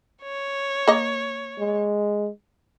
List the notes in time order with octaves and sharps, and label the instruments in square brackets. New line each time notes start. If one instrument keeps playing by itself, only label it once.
[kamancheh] C#5
[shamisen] A#3 D#5
[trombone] G#3